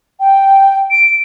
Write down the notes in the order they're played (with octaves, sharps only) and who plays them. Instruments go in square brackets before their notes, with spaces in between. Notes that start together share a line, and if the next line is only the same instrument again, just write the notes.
[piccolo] G5
D7